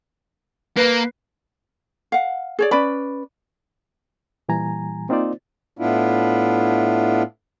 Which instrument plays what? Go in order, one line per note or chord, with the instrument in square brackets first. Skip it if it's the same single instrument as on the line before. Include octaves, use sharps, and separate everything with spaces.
[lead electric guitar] A#3 [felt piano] B4 C7
[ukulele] F5 F#5
G#4 C#5 D5
C#4 B4 D5 B5
[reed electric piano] A#2 E3 G3 G#5 A#5
A#3 C4 D#4 F4 C5 D5
[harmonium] A2 B3 D4 E4 F4